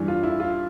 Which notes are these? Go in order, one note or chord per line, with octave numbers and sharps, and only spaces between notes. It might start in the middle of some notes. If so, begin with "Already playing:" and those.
Already playing: G2 E3
F4
E4
F4